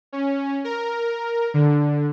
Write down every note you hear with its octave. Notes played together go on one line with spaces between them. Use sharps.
C#4
A#4
D3